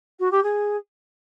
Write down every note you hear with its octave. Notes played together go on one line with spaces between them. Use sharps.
F#4
G4
G#4